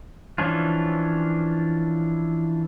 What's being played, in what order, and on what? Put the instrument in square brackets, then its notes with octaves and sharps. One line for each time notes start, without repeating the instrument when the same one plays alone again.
[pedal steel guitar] E3 F3 C#4 D4 F4